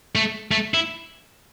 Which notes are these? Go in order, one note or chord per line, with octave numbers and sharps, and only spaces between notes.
A3
A3
E4